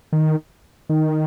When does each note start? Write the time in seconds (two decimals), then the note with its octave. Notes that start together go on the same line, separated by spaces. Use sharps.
0.13 D#3
0.89 D#3